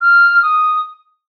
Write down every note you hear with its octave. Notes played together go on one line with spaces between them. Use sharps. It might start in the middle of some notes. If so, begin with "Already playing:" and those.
F6
D#6